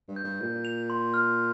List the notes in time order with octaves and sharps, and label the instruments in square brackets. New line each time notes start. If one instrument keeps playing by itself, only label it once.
[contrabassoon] G2
[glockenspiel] G6
[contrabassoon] G2
[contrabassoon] A#2 [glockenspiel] G6
[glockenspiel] F7
C6
F6